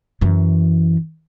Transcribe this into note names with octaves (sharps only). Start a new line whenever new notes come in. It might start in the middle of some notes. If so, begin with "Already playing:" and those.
F#2 E3